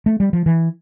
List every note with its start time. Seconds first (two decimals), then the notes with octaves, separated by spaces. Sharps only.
0.06 A3
0.20 G3
0.33 F3
0.46 E3